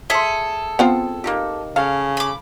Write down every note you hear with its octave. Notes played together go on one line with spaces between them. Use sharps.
G#4 A4 E5 C6
B3 C4 F4
A#3 D#4 G4
C#3 A4 F5
B5 D6